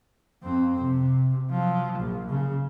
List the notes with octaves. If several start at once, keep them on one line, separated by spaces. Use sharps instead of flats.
F2 C4
C3
F3 F#3
A#1
C#3